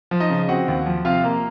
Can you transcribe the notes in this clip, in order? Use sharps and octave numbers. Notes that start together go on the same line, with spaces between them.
F3
D#4 D#5
C#3
C4 F#4 F#5
D#2
F3
C3 F4 F5
A#3